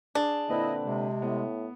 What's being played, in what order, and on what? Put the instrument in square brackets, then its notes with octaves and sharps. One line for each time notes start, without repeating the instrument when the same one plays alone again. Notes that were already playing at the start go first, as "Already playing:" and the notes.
[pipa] D4 [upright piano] G#4
[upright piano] A#2 C4 B4 [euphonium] D3 [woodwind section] E4 D#5
[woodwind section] C3 G#3
[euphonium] A2 [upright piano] B3